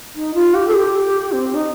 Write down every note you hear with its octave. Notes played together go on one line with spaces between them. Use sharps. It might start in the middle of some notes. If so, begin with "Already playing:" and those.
D#4
F4
G4
A4
G4
C4
D#4